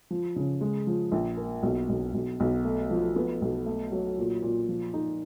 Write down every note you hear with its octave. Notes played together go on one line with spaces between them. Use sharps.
F3
C#3
G#3
F3
A#1
A#3
B1
B1
B1
B1
A3
F3
B3
B1
A3
F#3
A#2
A#2
F3
D#4